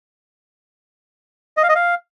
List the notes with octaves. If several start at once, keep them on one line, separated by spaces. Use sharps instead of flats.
D#5
F5
D#5
F5